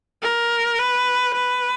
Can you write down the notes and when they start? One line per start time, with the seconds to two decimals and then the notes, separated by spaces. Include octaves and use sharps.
0.22 A#4
0.78 B4
1.34 B4